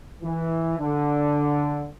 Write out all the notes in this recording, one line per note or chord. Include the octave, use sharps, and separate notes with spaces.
E3
D3